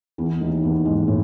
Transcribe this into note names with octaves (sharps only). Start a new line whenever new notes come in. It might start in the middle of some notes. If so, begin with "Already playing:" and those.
E2 E3
D#2 D#3
E2 E3
G#2 G#3
A2